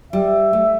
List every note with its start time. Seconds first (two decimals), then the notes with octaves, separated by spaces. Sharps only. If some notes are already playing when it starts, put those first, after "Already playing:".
0.13 G3 E5
0.53 A3